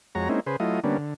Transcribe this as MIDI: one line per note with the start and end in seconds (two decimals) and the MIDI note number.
0.15 0.28 41
0.15 0.28 56
0.15 0.28 66
0.15 0.28 73
0.15 0.28 82
0.29 0.40 56
0.29 0.40 58
0.29 0.40 60
0.29 0.40 61
0.29 0.40 63
0.29 0.40 64
0.47 0.56 49
0.47 0.56 68
0.47 0.56 71
0.47 0.56 72
0.60 0.80 54
0.60 0.80 57
0.60 0.80 64
0.60 0.80 65
0.60 0.80 75
0.84 0.97 50
0.84 0.97 55
0.84 0.97 58
0.84 0.97 59
0.84 0.97 61
0.84 0.97 62
0.98 1.14 50